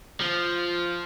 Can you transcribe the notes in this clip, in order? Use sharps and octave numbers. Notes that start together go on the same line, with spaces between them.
F3